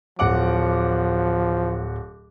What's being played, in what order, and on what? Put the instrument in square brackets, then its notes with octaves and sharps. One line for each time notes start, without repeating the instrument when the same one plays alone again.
[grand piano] D1 F#5 D6 [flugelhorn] F3